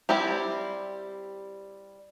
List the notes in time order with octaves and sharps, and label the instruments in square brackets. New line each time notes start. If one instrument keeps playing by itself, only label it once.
[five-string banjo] G3 C4 E4 G4